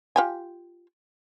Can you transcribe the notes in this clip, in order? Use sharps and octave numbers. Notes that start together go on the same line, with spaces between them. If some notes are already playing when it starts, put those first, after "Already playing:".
F4 G4 G#5